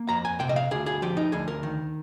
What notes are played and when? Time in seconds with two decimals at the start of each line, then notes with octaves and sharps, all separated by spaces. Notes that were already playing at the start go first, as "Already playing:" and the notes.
Already playing: A#3
0.09 F2 A#5
0.25 G#5
0.40 C3 G5
0.49 D#5
0.56 F5
0.71 D2 G#4
0.86 G#4
1.02 F3 G4
1.17 D#4
1.32 D2 G#4
1.48 A#4
1.63 D#3